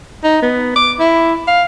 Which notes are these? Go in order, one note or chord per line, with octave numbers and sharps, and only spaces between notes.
D#4
B3
D6
E4
F5